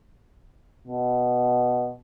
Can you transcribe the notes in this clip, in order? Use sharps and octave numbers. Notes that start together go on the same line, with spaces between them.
B2